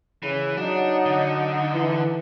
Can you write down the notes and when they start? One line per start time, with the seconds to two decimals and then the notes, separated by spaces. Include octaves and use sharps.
0.23 C#3 E3
0.57 F#3 D4 D#4 F#5
1.06 D3
1.74 E3